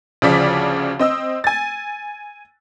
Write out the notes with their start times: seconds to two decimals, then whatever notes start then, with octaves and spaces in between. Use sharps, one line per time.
0.22 D2 C#3 F3 D5 B6
0.99 C4 D#5 E6
1.44 G#5 A6